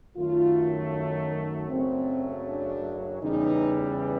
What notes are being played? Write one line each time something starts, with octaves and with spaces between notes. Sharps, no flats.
F#2 D#3 F#3 A3 F4
D#4
F#1 F#2 C#3 F#3 A3 C4
D4
E2 C#3 E3 G3 D#4